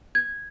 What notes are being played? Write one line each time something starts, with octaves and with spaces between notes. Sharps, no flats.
G#6